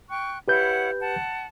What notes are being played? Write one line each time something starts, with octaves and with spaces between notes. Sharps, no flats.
G5 C#6 F#6
E4 G4 B4 C#5 F#5 G6
F#5 A5